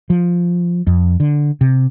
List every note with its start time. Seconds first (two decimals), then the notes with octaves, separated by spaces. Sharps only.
0.10 F3
0.87 F2
1.20 D3
1.61 C3